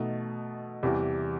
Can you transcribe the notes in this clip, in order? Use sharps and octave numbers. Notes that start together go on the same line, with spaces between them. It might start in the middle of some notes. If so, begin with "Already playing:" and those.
Already playing: B2 A3 D#4
E2 C3 E3 G3